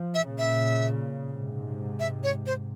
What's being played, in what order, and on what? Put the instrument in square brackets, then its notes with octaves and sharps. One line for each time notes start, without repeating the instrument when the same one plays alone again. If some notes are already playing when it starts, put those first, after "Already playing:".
Already playing: [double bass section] F3
[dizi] E5
[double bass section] A#2 C#3
[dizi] E5
[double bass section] G#2 C3
[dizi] E5
C#5
C5